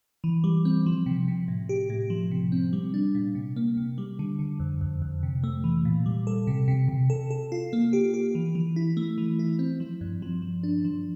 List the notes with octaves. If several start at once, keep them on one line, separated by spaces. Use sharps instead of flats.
E3
G3
C4
F3
C3
C3
A2
G4
A2
F3
C3
C4
G3
D4
A#2
C3
A#3
C3
G3
D3
D3
F2
F2
F2
C3
A3
E3
A#2
G3
A4
C3
C3
C3
A4
A4
F4
A#3
G4
G4
E3
E3
E4
A3
E3
E4
C4
F3
G2
F3
F3
D4
F3